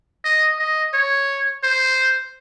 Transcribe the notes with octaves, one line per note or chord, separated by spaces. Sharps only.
D#5
D#5
C#5
C5